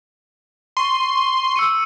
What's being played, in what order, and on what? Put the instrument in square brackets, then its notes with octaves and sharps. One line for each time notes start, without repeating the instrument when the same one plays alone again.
[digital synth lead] C6 [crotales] C#6
[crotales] E6 C#7 D#7